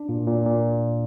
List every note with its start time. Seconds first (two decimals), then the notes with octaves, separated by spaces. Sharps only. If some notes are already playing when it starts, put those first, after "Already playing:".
Already playing: D4
0.09 A#2
0.27 A#2
0.45 A#2